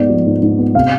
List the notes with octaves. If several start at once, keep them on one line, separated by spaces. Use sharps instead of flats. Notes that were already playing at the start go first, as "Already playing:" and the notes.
Already playing: G#2 B3 D5
F3
G#2
G#2
B3
C3 F5